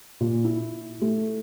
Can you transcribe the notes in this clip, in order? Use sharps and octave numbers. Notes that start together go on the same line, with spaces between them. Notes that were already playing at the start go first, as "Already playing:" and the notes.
A#2
E4
A3